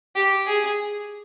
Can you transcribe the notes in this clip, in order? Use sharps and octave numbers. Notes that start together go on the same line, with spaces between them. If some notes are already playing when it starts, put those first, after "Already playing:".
G4
G#4